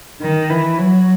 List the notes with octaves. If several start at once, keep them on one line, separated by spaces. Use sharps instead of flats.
D#3
E3
F#3